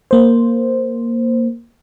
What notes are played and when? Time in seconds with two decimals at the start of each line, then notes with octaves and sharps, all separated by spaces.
0.11 A#3 C5